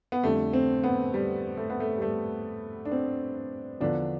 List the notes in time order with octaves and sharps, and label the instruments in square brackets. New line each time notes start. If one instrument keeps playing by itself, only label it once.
[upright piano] B3
F2 D3 G3 A3
C4
B3
G3
A3
B3
A3
G3
A3
D4
C4
E2 D3 F3 D4